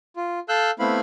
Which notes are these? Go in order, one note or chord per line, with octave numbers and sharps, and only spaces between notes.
F4
A4 F5 E6 F#6 G6
A3 B3 C4 E4 F5 B5